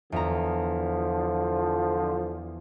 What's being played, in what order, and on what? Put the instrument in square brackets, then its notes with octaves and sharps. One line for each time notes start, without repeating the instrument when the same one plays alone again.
[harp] E2 A#5 [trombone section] D3 F3